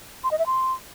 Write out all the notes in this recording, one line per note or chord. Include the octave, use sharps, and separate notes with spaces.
C6
D#5
E5
C6